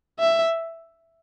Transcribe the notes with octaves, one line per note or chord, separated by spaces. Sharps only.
E5